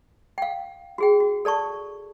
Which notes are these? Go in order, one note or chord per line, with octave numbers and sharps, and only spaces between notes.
F5 G5
F#4 G#4 G5
F#4
A4 D5 A5 C#6